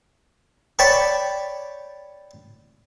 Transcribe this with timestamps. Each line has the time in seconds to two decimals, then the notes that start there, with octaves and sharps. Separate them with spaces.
0.79 C#5 D5 G5 A5 B5 C#6